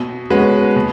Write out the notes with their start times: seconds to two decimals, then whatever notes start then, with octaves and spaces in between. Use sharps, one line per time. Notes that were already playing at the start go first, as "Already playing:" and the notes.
Already playing: B2
0.30 G#3 C#4 F#4 B4
0.76 B2